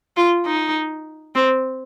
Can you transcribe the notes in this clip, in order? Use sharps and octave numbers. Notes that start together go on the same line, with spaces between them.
F4
D#4
C4